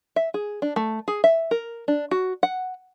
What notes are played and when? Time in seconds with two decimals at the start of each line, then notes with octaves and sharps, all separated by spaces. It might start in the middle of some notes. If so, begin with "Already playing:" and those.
0.16 E5
0.34 G#4
0.62 D4
0.76 A3
1.08 G#4
1.24 E5
1.51 A#4
1.88 D4
2.11 F#4
2.43 F#5